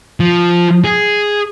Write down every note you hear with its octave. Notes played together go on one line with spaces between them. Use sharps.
F3
G#4